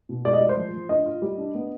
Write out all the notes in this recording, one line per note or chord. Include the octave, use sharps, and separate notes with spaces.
B2
G#3 D5
D#5
G#3 D5
C5
F3
F3
D4 D#5
F4
G3
D4
B3